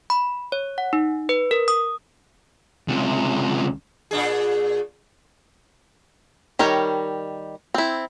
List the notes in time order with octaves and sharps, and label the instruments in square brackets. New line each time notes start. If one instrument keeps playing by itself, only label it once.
[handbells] B5
C#5
F#5
D#4
B4
A#4
D#6
[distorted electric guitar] C#2 C3
[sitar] A#2 D4 G#4
[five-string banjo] D#3 G3 A#4 C#5
C4 E4